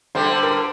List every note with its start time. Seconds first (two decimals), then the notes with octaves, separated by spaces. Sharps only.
0.15 D3 G3 C5
0.43 A#4